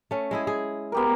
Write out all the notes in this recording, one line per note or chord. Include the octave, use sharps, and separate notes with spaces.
A3 C#4
G#3 E4 G#4
G#4
B3 G4 A#4